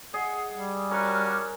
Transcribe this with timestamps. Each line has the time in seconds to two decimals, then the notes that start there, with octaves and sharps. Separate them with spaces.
0.14 G#4 D#5 F#5
0.53 G3
0.91 C#4 D4 F#4 A#4 D6 F6